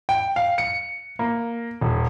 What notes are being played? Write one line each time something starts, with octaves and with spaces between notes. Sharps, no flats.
G5
F5
C#7
A#3
D#1